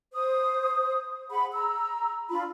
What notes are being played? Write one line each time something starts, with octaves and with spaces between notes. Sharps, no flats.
C5 D#6
G#4 F#5 B5
A#5 E6
D4 F4 B5